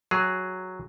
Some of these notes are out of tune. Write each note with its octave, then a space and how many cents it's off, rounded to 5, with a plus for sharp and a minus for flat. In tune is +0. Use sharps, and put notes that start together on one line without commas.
F#3 +0 G#4 +0